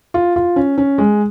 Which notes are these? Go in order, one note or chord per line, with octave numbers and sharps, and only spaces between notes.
F4
F4
C#4
C#4
G#3